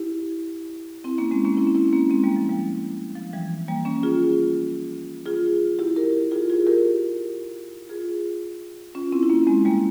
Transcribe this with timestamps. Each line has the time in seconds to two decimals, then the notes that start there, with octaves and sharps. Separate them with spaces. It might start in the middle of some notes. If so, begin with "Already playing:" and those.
Already playing: E4 G4
1.04 C4 E4
1.18 A#3 C#4
1.31 G#3 C4
1.45 A#3 C#4
1.57 C4 E4
1.67 C#4
1.75 C4 E4
1.88 C4
1.93 A#3 C#4
2.10 G#3 C4
2.24 G3 A#3
2.36 F3
2.49 G3 A#3
3.15 F3
3.33 E3 G3
3.68 G3 A#3
3.85 A#3 C#4
4.03 F4 G#4
5.26 F4 G#4
5.79 E4 G4
5.96 G4 A#4
6.31 F4 G#4
6.50 F4 G#4
6.67 G4 A#4
7.89 F4 G#4
8.95 C#4 F4
9.12 C4 E4
9.23 E4
9.30 A#3 C#4
9.47 G#3 C4
9.65 G3 A#3